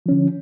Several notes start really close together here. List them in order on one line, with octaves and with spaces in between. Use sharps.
F3 C#4 D3